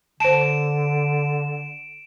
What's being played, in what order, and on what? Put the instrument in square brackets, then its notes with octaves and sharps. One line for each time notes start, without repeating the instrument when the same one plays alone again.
[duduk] D3 [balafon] C5 A5 [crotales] D7 E7